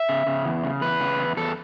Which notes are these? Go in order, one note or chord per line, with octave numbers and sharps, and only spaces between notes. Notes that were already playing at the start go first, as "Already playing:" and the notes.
Already playing: E5
C#3
C#3
E2
C#3
E2 B4
C#3
E2
E2 A4